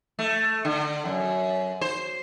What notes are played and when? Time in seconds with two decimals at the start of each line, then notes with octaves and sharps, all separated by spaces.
0.19 A3
0.65 D3
1.05 F#2
1.81 C5